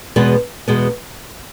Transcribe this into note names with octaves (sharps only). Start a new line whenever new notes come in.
E2 B2 G#3 B3
E2 B2 G#3 B3